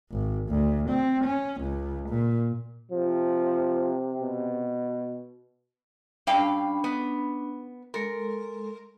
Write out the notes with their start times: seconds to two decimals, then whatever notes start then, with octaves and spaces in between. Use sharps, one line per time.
0.11 G#1
0.49 D2
0.89 C4
1.24 C#4
1.61 C#2
2.09 A#2
2.92 C3 F3
4.22 B2
6.27 G2 C#4 D4 F5 G5 B5
6.84 B3
7.94 G#3 A4 A#4 C6